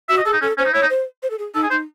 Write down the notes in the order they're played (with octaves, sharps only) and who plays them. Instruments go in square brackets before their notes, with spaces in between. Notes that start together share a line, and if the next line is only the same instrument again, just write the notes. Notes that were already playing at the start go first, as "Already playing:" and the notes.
[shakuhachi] F#4 [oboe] E5
[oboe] D#5
[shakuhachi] G#4 [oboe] A4
[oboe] D#4
[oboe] C#4 [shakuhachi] A4
[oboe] C#4 [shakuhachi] C5
[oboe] D#4
[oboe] E4 [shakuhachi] C#5
[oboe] D#4
[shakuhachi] C5
C5
A4
G#4
[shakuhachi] D#4 [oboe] A4
[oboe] G#4
[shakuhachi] D#4 [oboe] C5